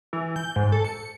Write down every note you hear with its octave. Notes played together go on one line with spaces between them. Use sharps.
E3
G6
G#2
A4
C#7